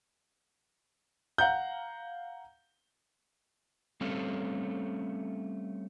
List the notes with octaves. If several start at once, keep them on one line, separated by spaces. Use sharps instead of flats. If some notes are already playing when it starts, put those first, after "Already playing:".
F5 F#5 A#5 G6
G3 A3 C4 C#4 A4 F5